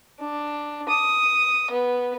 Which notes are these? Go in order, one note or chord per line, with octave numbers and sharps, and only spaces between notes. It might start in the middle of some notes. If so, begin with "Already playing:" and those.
D4
D#6
B3